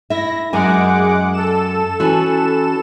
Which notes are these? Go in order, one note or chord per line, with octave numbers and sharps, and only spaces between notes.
E4 E5 A#6
F#2 G#3 A#4 F#5 G#5 D6
A4 E7
E3 C#4 F#4